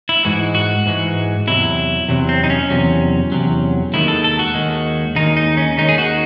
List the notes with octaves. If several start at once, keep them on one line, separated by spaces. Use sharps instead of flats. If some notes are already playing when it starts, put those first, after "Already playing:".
E4
G#2 E3 G#3 F#4
F#4
G#2 E3 G#3
E2 C3 F#3 E4
E2 C3 F#3
C4
D#4
C#4
E2 C3 F#3
E2 C3 F#3
D#2 D#3 G#3 E4
A4
A4
F#4
D#2 D#3 G#3
D#2 D#3 G#3 D#4
D#4
C#4
D#2 D#3 G#3 D#4
G#4
F#4